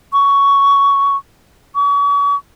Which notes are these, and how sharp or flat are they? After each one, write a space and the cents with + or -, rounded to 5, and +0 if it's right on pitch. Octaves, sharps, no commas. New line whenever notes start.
C#6 +10
C#6 +40